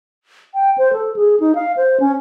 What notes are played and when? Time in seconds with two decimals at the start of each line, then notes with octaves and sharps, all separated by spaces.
0.54 G5
0.78 C5
0.93 A4
1.16 G#4
1.40 D#4
1.55 F5
1.77 C5
2.00 C#4